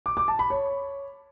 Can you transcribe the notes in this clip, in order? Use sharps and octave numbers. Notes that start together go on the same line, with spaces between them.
D6
D6
A5
B5
C#5